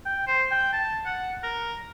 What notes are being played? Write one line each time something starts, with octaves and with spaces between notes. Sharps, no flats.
G5
C5
G5
A5
F#5
A#4